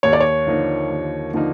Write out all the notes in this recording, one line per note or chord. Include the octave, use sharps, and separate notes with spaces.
D#2 C#5
D5
C#5
D3 F3 A#3 D#4
D#2
D3 F3 A#3 D#4